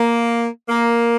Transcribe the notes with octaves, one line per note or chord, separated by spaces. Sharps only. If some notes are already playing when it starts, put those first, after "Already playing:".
Already playing: A#3
A#3